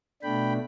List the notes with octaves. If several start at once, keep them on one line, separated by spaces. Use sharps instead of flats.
B2 A3 D4 G5 B5